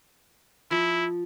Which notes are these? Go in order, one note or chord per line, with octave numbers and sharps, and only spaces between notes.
F3 E4